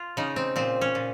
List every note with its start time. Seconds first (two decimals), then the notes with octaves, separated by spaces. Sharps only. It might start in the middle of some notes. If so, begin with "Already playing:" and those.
Already playing: F4
0.17 C#3 D#4
0.36 C4
0.56 A#2 C4
0.81 C#4
0.95 A#2